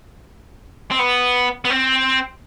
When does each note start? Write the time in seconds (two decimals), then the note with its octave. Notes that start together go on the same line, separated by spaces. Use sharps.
0.91 C4
0.99 B3
1.65 B3
1.70 C4